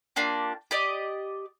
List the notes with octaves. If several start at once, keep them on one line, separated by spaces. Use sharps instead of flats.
A#3 D4 F4 G4
G4 D5 D#5